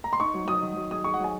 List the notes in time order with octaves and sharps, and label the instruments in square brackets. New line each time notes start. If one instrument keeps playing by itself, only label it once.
[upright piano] A#5
C6
[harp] D#4 [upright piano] C#6
[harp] F#3
[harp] F#3 [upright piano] D#6
[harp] D#3
F#3
[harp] G#4 [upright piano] D#6
[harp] G#4 [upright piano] C#6
[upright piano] F#5
[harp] F#3 [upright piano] G#5